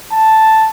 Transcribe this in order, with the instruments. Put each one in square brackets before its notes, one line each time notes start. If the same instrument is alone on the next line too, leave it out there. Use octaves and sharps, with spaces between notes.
[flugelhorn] A5